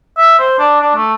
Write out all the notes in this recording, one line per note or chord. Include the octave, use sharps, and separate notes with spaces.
E5
C5
D4
D4
A3